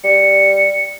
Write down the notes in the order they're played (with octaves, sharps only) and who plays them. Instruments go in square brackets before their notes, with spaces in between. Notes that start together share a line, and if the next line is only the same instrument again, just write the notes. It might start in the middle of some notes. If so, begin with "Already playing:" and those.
[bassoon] G3 [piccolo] C#7